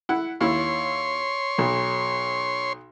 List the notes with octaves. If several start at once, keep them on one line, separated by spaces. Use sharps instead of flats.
E4 F#5
D#2 E4 C#5 C6
B1